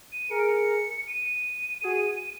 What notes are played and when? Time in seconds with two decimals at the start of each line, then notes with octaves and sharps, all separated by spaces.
0.12 D#7
0.31 G#4 A#4 C#7
0.39 D7
0.47 C#7
1.08 D#7
1.83 F#4 G#4